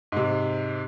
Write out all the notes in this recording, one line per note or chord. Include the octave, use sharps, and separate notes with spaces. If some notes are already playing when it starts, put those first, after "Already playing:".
G#2 C3